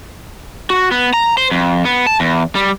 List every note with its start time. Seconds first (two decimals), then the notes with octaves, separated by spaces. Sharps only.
0.70 F#4
0.91 B3
1.13 A#5
1.37 C5
1.51 F2
1.85 B3
2.07 A5
2.20 E2
2.55 G3